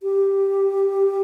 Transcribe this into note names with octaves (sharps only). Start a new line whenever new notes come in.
G4